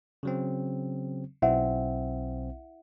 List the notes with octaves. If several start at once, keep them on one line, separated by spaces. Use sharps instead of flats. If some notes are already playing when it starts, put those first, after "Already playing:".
C#3 F#3 C4
B1 C4 E4 E5 F#5